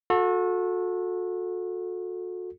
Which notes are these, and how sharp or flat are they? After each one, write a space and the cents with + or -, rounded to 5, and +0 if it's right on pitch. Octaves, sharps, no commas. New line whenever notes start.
F#4 -35 A4 +0